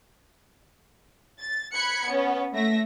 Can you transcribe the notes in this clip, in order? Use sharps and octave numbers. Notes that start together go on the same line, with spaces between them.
A6
B5 F#6 G#6 C#7
B3 C#4
A3 E5 A#6